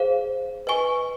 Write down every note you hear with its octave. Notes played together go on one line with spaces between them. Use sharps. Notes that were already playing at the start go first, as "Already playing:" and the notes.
Already playing: G#4 C5 F5
B4 D#5 G#5 C#6